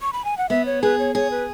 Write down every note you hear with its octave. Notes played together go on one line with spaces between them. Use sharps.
C#6
B5
G#5
F#5
B3 E5
C#5
G#4 B4
C#5
G#4 C#5
B4